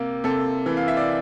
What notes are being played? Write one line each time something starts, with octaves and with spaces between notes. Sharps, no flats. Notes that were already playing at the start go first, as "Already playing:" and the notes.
Already playing: C3 A#3
C3 A4
E3
F5
E5
D5